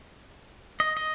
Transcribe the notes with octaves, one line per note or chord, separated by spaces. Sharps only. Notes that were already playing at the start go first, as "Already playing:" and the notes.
D#5
D#5